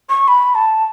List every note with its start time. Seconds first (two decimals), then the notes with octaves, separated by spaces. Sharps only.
0.09 C#6
0.28 B5
0.55 A5